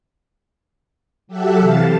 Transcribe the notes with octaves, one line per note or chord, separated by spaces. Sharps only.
F#3 G4 A4 E5 F#5
C3 E3 F5 A5 A6